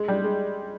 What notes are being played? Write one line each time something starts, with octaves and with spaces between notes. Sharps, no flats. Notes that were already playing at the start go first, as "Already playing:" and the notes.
Already playing: G#3
G3
G#3